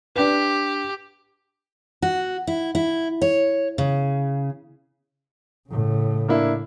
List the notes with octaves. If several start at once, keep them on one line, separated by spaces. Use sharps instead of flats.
D4 G4 B4
F#4
E4
E4
C#5
C#3
A2 C#3
A#3 D4 E4